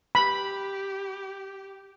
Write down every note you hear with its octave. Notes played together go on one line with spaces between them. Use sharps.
G4 B5